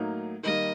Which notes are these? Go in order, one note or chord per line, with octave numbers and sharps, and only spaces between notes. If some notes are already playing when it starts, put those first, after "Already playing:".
Already playing: A2 F#3 A#3 D#4
D#3 G3 A#3 D#5